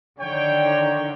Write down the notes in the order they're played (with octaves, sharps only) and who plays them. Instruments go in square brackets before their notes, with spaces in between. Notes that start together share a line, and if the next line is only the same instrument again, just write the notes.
[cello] D3 D#3 [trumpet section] C#5 G5